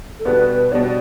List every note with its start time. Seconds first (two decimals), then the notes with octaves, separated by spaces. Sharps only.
0.19 A4
0.25 B2 G3 B3 D4 B4
0.48 B4
0.72 B2 G3 B3 D4 D5
0.84 D5